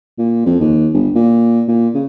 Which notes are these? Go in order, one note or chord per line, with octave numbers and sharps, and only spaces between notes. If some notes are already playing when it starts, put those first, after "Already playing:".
A#2
F2
D#2
G1
A#2
A#2
C#3